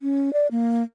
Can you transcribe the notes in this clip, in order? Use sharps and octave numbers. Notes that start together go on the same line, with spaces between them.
C#4
D5
A#3